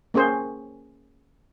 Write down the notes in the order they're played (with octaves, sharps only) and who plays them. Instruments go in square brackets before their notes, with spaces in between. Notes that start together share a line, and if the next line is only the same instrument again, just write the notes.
[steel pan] A#3 C#4 G#4 C5